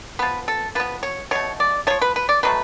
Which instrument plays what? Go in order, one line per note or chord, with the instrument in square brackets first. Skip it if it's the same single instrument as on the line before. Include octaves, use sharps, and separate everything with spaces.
[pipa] F3 B3 B4
A4
F3 B3 B4
C#5
B2 A3 C#5
D5
F3 A3 C#5
B4
B4
D5
B2 F#3 A3 B4